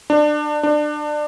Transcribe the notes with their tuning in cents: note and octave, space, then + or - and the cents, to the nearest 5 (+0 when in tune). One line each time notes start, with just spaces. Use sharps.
D4 +25
D4 +25